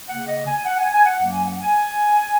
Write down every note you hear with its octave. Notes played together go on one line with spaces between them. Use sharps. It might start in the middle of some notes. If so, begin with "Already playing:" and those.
C#3 A#3 F#5
D#5
G#5
F#5
G#5
G#5
F#5
F#2 F#3 A#3
G#5
F#5
G#5